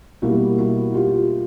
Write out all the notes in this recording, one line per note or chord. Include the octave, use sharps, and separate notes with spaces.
B2 G3 A#3 E4 F#4
E4 F#4
F4 G4